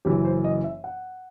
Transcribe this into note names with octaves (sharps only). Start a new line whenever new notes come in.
F#1 F#2 E3 G4
C5
D#5
E5
F#5